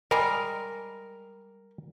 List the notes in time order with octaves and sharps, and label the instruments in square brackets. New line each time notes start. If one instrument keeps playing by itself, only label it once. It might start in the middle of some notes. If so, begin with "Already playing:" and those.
[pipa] G3 G#3 [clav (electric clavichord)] A#4